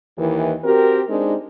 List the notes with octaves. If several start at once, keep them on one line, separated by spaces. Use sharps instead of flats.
D#2 D#3 E3
C4 F#4 G4 A#4
G#3 C4 D4 D#4